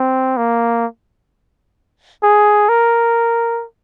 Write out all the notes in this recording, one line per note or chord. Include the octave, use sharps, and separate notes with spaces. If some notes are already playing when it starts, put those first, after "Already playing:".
Already playing: C4
A#3
G#4
A#4